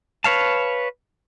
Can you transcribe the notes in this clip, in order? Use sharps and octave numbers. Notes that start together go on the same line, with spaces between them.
B4 C#5 F5 A5